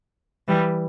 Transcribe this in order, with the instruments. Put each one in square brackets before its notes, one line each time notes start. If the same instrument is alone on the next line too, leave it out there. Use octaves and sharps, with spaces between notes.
[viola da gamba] E3 G3